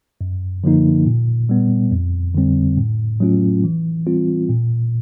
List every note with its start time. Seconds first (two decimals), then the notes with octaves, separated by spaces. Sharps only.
0.21 F#2
0.64 D3 F3 A#3 D#4
1.06 A#2
1.49 G3 B3
1.92 F2
2.35 D3 G3 C4
2.77 A2
3.20 F#3 A3 C#4 F4
3.64 E3
4.07 G3 C4 F4
4.49 A#2